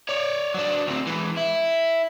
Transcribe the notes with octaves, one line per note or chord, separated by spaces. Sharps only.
C#5 D5
F#3 D4
D2 C4
E3 G#3
E4